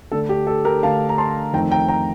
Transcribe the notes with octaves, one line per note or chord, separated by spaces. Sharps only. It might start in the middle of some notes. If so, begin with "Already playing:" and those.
D3 A3 D4 A4
G4
A4
G4 A#4
D3 A3 D4 F5 A5
A#5
A5 C6
F2 D#3 A3 C4 D#4 G5 A#5
G5 A#5
G5 A#5